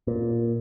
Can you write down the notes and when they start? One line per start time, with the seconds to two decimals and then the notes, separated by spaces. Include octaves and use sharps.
0.07 A#2